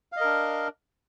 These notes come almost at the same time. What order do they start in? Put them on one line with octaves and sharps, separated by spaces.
F5 D#5 A#4 D4